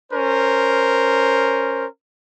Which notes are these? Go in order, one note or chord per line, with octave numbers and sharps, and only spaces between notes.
C#4 A#4 C5